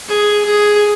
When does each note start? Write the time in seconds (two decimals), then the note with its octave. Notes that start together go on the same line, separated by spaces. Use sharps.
0.08 G#4
0.45 G#4